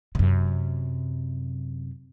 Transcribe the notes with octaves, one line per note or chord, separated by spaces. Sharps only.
F#2 C3